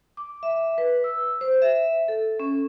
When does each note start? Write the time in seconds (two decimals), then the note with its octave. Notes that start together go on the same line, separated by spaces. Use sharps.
0.17 D6
0.43 E5
0.78 B4
1.04 E6
1.41 C5
1.62 E5
2.08 A4
2.40 C#4